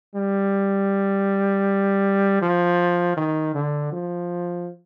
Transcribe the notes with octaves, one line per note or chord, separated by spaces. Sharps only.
G3
F3
D#3
D3
F3